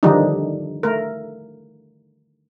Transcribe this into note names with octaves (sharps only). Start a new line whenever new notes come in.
D3 D#3 F3 G3 D4 D#4
A3 A#4